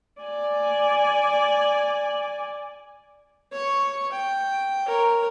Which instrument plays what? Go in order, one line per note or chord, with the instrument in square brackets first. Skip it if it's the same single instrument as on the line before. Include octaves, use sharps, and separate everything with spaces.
[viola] D5 G#5
[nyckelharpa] C#5 C#6
G5
A#4 C#5